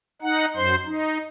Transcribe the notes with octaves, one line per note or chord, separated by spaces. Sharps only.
D#4 F#5
F#2 C5 C6
D#4